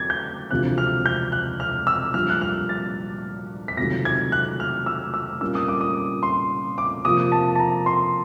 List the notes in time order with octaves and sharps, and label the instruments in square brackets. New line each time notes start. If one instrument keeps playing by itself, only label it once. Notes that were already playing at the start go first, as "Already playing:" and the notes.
Already playing: [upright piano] F#3 [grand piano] G#6 A6
[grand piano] G6
[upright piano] E1 D2 C3 F3 [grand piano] F#6
[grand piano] F6
G6
F#6
F6
E6
[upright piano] A#1 A#2 G3 [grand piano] F6
[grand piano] F#6
F6
A6
B6
[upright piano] C#2 C3 D#3 F#3 A3 [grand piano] A#6
[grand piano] G#6
F#6
F6
E6
E6
[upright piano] A#2 G3 A#3 C#4 [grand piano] E6
[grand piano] D#6
D6
D#6
C6
D6
[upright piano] C3 F3 A#3 [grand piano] D#6
[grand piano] A5
A5
A#5
C6